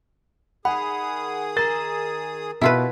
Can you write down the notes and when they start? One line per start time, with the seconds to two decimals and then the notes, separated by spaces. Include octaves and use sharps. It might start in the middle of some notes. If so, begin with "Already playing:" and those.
0.65 D#3 G#4 F#5 B5 D#6
1.57 A#4 A#5 A6
2.61 B2 E4 F4 B4